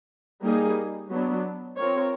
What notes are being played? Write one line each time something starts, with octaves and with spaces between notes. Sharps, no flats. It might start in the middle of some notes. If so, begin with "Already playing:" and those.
G3 A#3 D#4 G#4
F#3 B3 D4
C4 F4 A#4 C#5